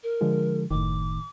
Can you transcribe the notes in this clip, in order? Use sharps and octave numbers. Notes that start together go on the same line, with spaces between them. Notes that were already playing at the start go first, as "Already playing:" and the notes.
A#4
D3 F3 G#3
F#1 A2 D#3 D6